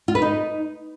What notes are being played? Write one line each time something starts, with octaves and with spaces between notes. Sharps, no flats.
F4
B4
D#4